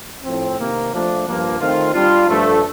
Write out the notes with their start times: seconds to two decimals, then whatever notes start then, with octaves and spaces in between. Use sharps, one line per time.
0.23 A2 F3 C4
0.58 C3 D#3 A#3
0.91 F3 A3 D4
1.26 G2 F3 A#3
1.59 D#3 A3 C4 F4
1.93 G3 D4 F4
2.27 G2 F3 A3 D4 A4